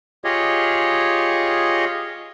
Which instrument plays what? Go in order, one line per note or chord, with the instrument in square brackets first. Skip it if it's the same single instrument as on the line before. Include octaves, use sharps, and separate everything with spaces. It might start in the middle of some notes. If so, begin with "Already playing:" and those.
[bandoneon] F4 G4 G#4 C#5 D#5